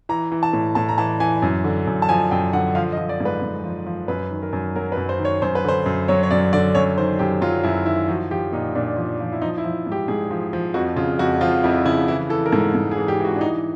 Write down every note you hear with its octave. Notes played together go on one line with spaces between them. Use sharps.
E3 A#5
E3
A5
A2
A2 A5
A#5
E3 A5
E3 G#5
F#2
D3
F#2
A5
F3 G#5
F#2 G5
D3 F#5
F3 F5
D#5
F3
D5
G#2
B4
G#2
F3
F3
F#2 B4
D#3
A#4
F#2
F#3 A#4
B4
F#2
C5
D#3
C#5
F#2 C5
B4
D3 C5
F#2
F#3 C#5
C#5
F#2 D5
D3 D5
F#2 C#5
D#3 C5
F#2 G4
F#3 F4
F#2 E4
D#3 E4
F3 F#4
F3 G4
A#2 D#4
A#2 D4
F3
F3
E4
F3 D#4
E4
F3
G#2
G4
G#2 G#4
F3
F3
F2 F#4
C#3 F4
F2 F#4
F3 F4
F2 E4
C#3 E4
E3 E4
E3 A4
A#4
G#2 A4
G#2
G#4
E3
G4
E3
F#4
D4
E3 D#4